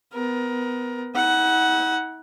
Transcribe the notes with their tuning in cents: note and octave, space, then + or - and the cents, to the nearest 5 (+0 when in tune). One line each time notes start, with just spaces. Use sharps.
B3 +20 A#4 +20
E4 -45 F#5 +10